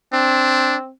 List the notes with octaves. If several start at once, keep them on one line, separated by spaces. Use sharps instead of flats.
C4 D4